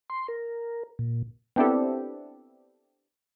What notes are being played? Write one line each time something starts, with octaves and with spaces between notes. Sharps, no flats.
C6
A#4
A#2
B3 C4 D4 E4 G4 A4